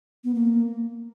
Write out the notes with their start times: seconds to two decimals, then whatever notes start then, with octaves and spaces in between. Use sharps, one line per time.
0.24 B3
0.35 A#3